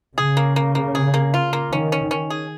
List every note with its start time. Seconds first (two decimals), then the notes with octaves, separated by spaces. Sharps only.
0.17 C#3 G#4
0.37 A#3
0.56 A#3
0.75 A#3
0.95 G#4
1.14 A#3
1.34 F4
1.53 A#3
1.72 D#3 C#4
1.92 C#4
2.11 C#4
2.30 G#4